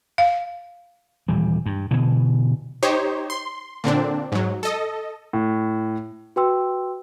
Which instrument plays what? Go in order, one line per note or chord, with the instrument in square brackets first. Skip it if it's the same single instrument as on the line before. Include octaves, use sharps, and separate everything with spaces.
[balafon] F5
[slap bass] D#1 E3 G3
G2
B2 D3 E3
[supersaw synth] D#4 G4 C5 C#5
C6
A#2 D3 C4 D4
G#2 F#3
A4 D#5
[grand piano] A2
[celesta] F#4 B4 G5 C6 E6